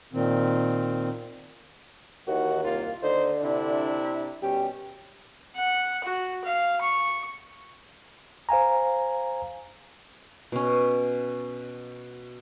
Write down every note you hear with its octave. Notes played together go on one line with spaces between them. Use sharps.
A#2 D#3 C4
D#2 D#3 E3 F#4
C2 A#3 F4
D#2 D3 D#4 C5
C3 D4 E4
B2 G3 C#4 G4
F#5
F#4
F5
C#6
C5 F5 G#5 A#5
B2 C#4